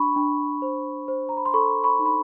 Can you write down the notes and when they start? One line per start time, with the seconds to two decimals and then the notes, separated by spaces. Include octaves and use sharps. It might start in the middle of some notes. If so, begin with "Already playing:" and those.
Already playing: D4 B5 C#6
0.16 D4
0.62 C5
1.08 C5
1.29 A#5
1.37 B5
1.45 C6
1.53 A4 B5 C#6
1.84 B5 C#6
1.99 D#4
2.06 B5